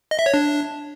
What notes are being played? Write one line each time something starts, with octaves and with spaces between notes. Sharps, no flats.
D#5
E5
C#5
D4